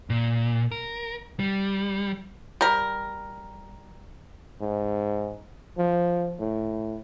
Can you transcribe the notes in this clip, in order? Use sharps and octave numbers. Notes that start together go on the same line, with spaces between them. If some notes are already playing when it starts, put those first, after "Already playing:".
A#2
A#4
G3
G3 A#4
G#2
F3
A2